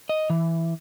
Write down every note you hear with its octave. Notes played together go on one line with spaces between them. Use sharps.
D#5
E3